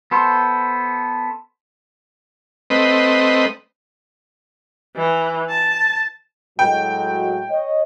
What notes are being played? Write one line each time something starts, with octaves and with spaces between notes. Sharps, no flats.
B3 A4 C5
A3 C4 B4 D#5
E3
A5
A2 F#3 G#3 G5
C#5 D#5